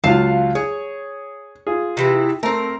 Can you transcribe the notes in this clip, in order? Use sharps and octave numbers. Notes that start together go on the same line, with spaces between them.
C#2 F#3 F4 F5 A5
G#4 C#5
F4 G#4
C3 E3 E4
A3 C4 A#4